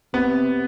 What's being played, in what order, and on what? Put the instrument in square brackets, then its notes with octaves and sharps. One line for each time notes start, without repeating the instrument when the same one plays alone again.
[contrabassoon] C3 [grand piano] B3